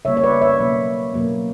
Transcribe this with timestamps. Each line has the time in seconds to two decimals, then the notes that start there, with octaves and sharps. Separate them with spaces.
0.05 C#3 G3 A#3 C#5 E5
0.17 C#5
0.23 B4 D5
0.42 C#5 E5
0.60 B2 F#3 A#3
1.14 B2 F#3 A#3